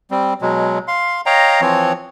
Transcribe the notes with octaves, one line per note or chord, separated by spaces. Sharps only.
G3 C4
B2 F#3 G#3
F5 C6
C#5 D#5 F5 G5 A#5
E3 F3 C4 C#5